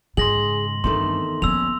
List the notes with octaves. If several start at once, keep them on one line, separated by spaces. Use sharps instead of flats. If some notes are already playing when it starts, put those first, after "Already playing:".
G#2 C#3 G#4 C6 A#6 F#7
E2 G2 D#3 A3 C4 C6
D3 F3 A#3 B3 C#4 E6 F7